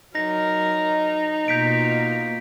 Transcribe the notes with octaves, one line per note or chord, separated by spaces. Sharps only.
F#3 D#4 A#4 A#6
B2 A#3 F4 G6 B6 D7